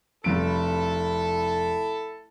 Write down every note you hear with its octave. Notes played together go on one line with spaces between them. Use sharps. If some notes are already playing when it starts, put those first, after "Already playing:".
F1 E4 A4 D7